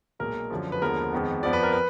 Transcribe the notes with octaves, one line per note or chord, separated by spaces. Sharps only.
B1 A#2 G#3 A#4
F#2 D3 F3
B4
D#2 D3 F3 G#3 B3 A#4
F2 D#3 G#3 B3
F2 F3 B3 D5
B4
A#4
B4